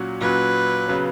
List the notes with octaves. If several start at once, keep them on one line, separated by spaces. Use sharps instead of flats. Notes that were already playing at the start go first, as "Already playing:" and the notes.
Already playing: A#2 F#3 C#4 F#4
A#2 F#3 C#4 F#4 B4
C#3 F#3 B3